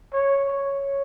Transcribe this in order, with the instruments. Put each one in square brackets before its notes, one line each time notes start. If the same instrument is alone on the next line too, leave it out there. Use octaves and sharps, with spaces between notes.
[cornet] C#5
C#5